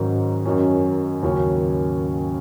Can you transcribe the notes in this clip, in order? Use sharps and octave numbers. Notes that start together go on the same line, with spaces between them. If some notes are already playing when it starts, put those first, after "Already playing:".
Already playing: G#2 D#3 F#3 C#4
F#2 D#3 F#3 C#4
D#2 C#3 F#3 C#4